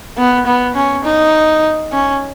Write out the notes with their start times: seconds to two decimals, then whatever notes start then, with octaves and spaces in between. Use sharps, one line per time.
0.17 B3
0.46 B3
0.75 C#4
1.04 D#4
1.92 C#4